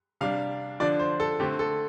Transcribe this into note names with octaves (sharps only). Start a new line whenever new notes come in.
C3 G3 D4 F5
D3 F3 D4 D5
C5
A4
D3 A3 C4 G4
A4